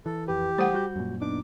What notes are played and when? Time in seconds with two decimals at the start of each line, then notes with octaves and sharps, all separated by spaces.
0.06 E3 A4
0.28 F2 G4 B4
0.58 G3 A3 C5 F#5 D#6
0.72 G3 F#4 G6
0.96 F#2 A#2
1.21 B3 D4 D#4 D6